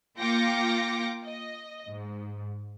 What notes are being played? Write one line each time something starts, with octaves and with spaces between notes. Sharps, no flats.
A#3 F4 G5 D6 A#6 C#7
D#5
G#2